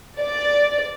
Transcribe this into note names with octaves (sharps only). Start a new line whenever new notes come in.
D5